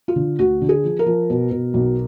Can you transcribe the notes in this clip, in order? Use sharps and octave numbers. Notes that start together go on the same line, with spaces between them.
F4
D3
D2 F#4
D3
G#4
F3
A#4
F3
B2
B2
B1